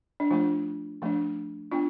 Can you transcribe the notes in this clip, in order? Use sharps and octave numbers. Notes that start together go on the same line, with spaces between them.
D4
F3 A3 D4 F4
F3 A3 D4
B3 D4 F4